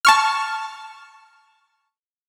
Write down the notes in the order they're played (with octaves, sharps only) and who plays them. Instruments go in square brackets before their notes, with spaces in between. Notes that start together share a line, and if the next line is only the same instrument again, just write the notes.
[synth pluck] A5 C#6 F6